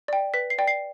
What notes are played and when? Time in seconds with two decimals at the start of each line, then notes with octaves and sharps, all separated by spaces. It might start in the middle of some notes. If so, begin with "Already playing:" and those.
0.08 D5 G5
0.34 B4 B6
0.50 C7
0.58 D5 G5
0.68 C7